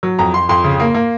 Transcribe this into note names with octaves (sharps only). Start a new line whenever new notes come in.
F#3
F2 A#5
F2 C6
F2 C6
C#3
A#3
A#3